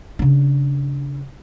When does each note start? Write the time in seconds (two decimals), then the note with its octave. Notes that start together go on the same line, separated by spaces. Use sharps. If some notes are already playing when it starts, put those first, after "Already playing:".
0.19 C#3 D4